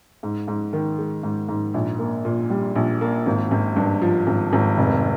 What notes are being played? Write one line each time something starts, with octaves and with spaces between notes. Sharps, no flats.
G#2
G#2
D#3
G#3
G#2
G#2
A#1
A#3
A#2
G3
A#1
A#3
G#1
G#1
G2
F3
G#1
G#1
F1